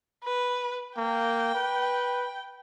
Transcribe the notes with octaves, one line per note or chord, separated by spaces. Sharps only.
B4
A#3 G5
B4